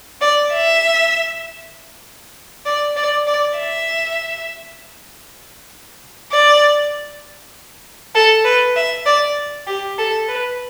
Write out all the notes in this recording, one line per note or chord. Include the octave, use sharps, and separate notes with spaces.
D5
E5
D5
D5
D5
E5
D5
A4
B4
E5
D5
G4
A4
B4